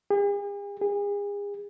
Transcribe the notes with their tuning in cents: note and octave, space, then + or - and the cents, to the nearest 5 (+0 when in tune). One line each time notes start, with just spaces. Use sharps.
G#4 -45
G#4 -35